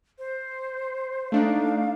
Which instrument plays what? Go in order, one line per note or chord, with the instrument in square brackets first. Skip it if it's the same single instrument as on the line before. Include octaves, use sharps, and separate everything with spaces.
[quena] C5
[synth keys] A3 D4 D#4 [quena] F5